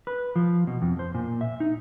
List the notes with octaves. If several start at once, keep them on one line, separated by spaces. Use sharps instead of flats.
B4
F3
B2
F2
C5
A#2
E5
D#4